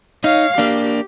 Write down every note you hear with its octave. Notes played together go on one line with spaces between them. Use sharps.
D#4 C#5 F5
A#3 D4 G4